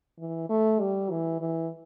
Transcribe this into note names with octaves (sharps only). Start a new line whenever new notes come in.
E3
A3
G3
E3
E3